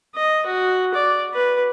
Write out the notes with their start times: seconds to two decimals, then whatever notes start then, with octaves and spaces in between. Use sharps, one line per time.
0.16 D#5
0.46 F#4
0.94 D5
1.34 B4